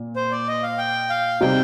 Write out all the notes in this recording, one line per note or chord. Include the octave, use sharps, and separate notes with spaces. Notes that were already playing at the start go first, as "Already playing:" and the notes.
Already playing: A#2
C5
D5
D#5
F5
G5
F5
C3 G3 C4 D#4 G5